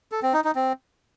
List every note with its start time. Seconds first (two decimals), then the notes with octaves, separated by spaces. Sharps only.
0.12 A4
0.23 C4
0.34 D#4
0.44 D#4
0.55 C4